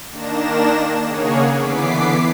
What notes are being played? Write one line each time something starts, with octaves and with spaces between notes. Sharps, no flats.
D#3 A#3 D4 A#6 E7
C#3 A#3 G#4 C#5 F#5
D3 E3 B3 D6 B6 C7